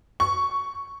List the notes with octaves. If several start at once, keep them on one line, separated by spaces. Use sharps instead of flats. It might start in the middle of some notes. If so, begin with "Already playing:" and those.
C#6